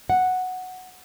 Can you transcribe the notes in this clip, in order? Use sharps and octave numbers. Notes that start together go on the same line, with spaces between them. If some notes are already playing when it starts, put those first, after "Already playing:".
F#5